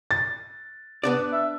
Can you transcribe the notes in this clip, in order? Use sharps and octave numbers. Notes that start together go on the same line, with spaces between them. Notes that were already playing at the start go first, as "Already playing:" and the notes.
A6
B3 D4 D5
E5